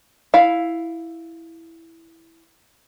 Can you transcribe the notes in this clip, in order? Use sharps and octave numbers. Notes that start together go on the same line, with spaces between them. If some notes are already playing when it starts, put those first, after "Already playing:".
E4 F5